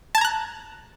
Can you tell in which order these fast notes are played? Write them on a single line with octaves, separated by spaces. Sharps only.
A5 G#6 A#5 F#6